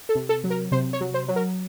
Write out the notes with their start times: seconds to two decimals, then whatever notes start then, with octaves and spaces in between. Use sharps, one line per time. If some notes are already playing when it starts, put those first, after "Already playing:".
0.09 A4
0.15 C3
0.29 A4
0.44 F#3
0.50 A#4
0.72 C3 C5
0.93 C#5
1.01 F#3
1.14 C5
1.28 F#3
1.36 A#4